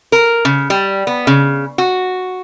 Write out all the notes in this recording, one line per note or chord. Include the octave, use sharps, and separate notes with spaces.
A#4
C#3
G3
B3
C#3
F#4